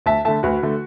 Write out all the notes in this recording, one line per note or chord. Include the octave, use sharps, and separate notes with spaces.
D2 E5 A5
D3 A3 E5 A5
D2 F#4 B4
D3 A3